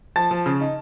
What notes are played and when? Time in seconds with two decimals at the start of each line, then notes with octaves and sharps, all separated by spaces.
0.16 F3 A5 A6
0.31 F3
0.46 C#3
0.60 D#4